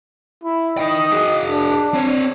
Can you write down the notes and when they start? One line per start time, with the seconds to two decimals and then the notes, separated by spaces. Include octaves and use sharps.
0.44 E4
0.77 D#4 D#5 G5
1.12 F#4 G#4
1.47 D4
1.94 C4 C#5